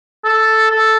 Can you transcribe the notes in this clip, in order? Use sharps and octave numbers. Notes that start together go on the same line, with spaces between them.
A4
A4